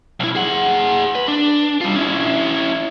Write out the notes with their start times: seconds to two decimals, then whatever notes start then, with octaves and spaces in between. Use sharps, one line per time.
0.20 B1 E4
0.35 G#4 F#5
1.15 B4
1.28 D4
1.81 G3 F4
1.95 C#4 E4